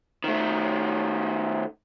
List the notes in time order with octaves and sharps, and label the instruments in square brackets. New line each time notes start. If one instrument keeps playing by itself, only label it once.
[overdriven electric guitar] D#3 A3